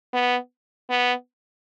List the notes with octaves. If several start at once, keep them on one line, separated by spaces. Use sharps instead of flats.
B3
B3